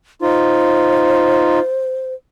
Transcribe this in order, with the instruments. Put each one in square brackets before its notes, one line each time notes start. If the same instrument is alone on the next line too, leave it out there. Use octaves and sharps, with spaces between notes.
[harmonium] D#4 F4 [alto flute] C5